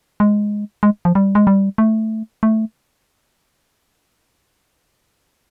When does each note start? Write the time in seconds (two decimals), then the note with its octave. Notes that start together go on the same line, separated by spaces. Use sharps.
0.20 G#3
0.83 G#3
1.05 F3
1.15 G3
1.35 G#3
1.47 G3
1.78 A3
2.43 A3